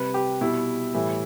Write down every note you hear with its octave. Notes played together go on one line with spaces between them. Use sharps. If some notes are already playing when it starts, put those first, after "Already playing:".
Already playing: C3 G3 B4
G4
B2 G3 E4
A2 E3 G3